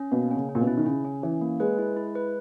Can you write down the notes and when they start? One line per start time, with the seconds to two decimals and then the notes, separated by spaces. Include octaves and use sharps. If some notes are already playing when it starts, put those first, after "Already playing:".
Already playing: C#4
0.12 B2 A#3
0.31 C#4
0.36 C#3
0.49 C#4
0.55 A#2
0.61 B2
0.67 E4
0.77 D#3
0.86 C#3 C#4
1.05 C#4
1.23 E3 C#4
1.41 A#3
1.60 G#3 B4
1.79 E4
1.96 E4
2.15 B4